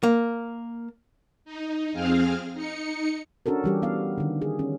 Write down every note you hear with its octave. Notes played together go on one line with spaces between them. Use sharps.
A#3
D#4
F2 C4 G#4 F5 F6
D#4 C#7
C#4 D4 F#4 A4 A#4
E3 G3 G4
B3 F5
D3 D#3
G#4
C#4